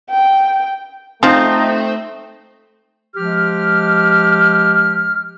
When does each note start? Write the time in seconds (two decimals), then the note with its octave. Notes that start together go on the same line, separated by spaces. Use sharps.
0.10 G5
1.23 F3 A3 C4 D#4
3.16 F3 G#3 G4 F6